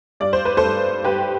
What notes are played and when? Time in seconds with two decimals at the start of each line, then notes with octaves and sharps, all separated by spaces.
0.20 G2 D5
0.33 C5
0.45 B4
0.57 A4 C5
0.63 G2
1.04 G2 G4 B4